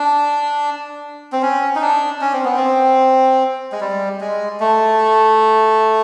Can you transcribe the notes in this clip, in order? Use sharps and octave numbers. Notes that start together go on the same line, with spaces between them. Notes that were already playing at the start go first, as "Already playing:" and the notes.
Already playing: D4
C4
C#4
D#4
D4
C#4
C4
B3
C4
G#3
G3
G#3
A3